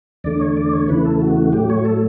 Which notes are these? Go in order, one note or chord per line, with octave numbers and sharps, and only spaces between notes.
E2 D3 A3 D5
C#5
D5
C#5
E2 C#3 E3 A3 B4
A4
F#4
F#4
A2 F#3 A3 G4
C#5
A4